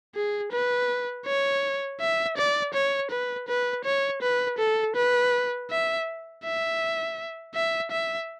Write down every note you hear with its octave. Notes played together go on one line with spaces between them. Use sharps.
G#4
B4
C#5
E5
D5
C#5
B4
B4
C#5
B4
A4
B4
E5
E5
E5
E5